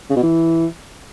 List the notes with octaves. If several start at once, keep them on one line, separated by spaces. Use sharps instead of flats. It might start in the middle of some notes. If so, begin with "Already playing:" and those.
C#3
B2
E3